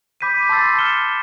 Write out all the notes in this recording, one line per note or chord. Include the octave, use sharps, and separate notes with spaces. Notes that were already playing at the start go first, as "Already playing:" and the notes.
B5 D6 G6 B6 D#7
A5 C6 E6 A6 C7
F6 A6 C#7 E7 G7